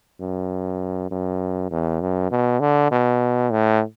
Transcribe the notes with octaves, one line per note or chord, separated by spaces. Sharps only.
F#2
F#2
E2
F#2
B2
D3
B2
A2